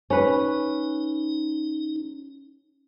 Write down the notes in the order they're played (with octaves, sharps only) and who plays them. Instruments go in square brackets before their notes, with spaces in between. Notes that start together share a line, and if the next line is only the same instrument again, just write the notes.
[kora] C#4 B4 [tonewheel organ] D#4